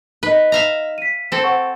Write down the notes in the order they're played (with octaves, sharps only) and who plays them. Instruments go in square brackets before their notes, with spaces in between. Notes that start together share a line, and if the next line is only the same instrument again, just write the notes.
[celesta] D#4 D#5 [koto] B4
[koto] E5 F5 A#5
[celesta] B6 D#7
[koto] C4 A4
[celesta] C5 F#5 C#6